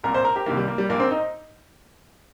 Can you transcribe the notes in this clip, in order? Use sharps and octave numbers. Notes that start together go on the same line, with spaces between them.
C2 A#2 A#4
C5
A#4
G4
C2 C3 D#3 A#3
G3
A#3
G3
A#1 A#2 A#3
C4
D#4